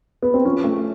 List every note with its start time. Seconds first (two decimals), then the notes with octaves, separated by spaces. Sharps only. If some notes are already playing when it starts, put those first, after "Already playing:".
0.22 B3
0.34 C4
0.45 F3 C#4
0.64 A3